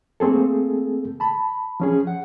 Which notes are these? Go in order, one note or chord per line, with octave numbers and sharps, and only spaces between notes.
A3 A#3 C4 G#4 A4
A5 B5
F3 C#4 G#4
F#5